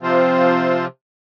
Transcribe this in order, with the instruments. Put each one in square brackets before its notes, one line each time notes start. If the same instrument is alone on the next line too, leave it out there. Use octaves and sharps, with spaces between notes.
[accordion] C3 F3 C4 F4 C5